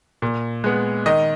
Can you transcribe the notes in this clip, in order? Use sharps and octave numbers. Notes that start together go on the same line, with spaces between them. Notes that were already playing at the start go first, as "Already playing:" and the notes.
A#2
G#3 B3
D#3 D#5